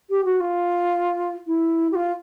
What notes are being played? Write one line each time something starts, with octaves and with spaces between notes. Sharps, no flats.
G4
F#4
F4
E4
G4
F4